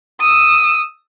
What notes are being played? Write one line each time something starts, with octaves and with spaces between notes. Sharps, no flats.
D#6 E6